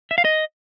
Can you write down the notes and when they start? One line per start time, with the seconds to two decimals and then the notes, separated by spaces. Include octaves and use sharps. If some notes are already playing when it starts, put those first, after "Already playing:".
0.11 E5
0.18 F5
0.25 D#5